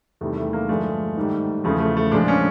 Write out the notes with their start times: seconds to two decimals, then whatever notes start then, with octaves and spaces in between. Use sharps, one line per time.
0.21 E2 C3 D#3 G3 A3
0.37 A3
0.53 A#3
0.68 G2 D3 F3 G#3 A3
1.17 G#2 D#3 G3
1.64 E2 C#3 F3 A3
1.80 A3
1.97 A3
2.11 A#2 F3 G#3 D4
2.28 C#4